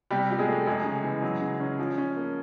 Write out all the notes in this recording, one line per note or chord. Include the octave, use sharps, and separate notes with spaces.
C3 G3 G4
F3 G4
G#3 G#4
A3
F#2 G#3 G#4
C#3
E3
F#3
C#3
C#4
F3
C#4
A#3